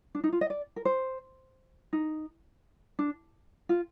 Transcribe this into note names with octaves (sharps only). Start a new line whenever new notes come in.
D4
D#4
F4
D#5
D5
A#4
C5
D#4
D4
F4